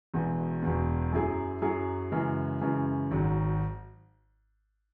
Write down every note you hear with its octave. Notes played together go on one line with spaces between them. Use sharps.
E1 E2 B2
E1 E2 B2
F#2 F#3 E4 G#4
F#2 F#3 E4 G#4
F#2 C#3 E3 G#3
F#2 C#3 E3 G#3
G#1 G#2 F#3